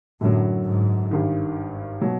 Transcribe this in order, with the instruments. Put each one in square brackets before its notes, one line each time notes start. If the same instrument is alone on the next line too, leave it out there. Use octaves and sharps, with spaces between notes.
[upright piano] F#2 D3 F#3 [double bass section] A2
[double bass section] G#2
[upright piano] G#1 G2 D#3
B2 F#3